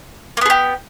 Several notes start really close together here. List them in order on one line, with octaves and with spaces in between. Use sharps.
A#3 B3 G#4 G4